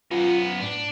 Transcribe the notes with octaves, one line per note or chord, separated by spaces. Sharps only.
F#2 B3 F4
A2 D4